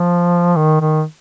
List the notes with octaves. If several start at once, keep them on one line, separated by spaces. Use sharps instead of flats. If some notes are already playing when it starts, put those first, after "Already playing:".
Already playing: F3
D#3
D#3